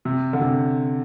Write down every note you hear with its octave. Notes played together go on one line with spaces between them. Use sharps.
C3
D3
C3